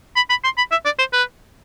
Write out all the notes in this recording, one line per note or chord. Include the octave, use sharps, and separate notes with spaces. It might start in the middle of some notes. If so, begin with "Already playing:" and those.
B5
B5
C6
B5
E5
D5
C5
B4